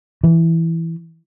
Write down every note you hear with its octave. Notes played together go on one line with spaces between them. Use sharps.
E3